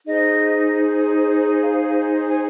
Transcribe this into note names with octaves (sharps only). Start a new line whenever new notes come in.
D#4 G#4 C5 D#5
F5
G#5